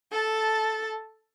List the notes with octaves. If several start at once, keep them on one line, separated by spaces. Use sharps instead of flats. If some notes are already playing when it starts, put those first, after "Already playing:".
A4 A5